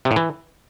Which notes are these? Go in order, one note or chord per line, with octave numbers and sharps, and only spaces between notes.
C3
A2
E3